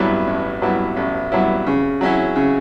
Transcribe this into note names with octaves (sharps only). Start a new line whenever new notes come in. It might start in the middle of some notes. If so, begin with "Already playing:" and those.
Already playing: A1 G2 F#3 B3 E4
A1
G2 F#3 B3 E4
A1
G2 F#3 B3 E4
C#3
F#3 C#4 E4
C#3